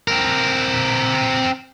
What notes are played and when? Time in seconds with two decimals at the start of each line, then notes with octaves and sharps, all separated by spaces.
0.08 C4 A#4